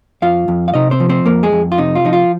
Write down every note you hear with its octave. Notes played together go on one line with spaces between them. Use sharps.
F2 F4 F5
F2
F5
C3 D#4 D#5
C4 C5
F3
C4 C5
F2 A#3 A#4
G#3 G#4
F2
F4
C3 D#4
F4
F3 D#4
F4